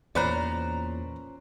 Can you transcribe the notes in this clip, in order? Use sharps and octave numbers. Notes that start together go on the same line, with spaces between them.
E2 A#2 C#4 C5 D5 A#5 B5 F#6